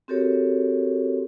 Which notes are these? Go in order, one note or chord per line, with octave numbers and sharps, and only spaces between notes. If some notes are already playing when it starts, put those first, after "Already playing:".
C4 F#4 G4 A4 A#4 C#5